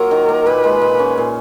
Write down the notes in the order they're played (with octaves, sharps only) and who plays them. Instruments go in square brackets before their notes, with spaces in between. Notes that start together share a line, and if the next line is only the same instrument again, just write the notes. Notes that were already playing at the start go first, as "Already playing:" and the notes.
Already playing: [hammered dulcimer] F#3 A#3 F4 [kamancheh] A#4
[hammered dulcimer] D#3
A#3
[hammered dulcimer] A#2 [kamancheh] B4
[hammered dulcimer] G#3
A#2
C#4
A#2